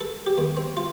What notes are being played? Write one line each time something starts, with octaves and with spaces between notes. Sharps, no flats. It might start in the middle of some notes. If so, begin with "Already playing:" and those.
A4
G4
D#2
C4
F4